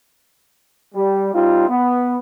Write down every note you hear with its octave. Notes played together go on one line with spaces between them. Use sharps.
G3
G3 C4 D#4 F4
B3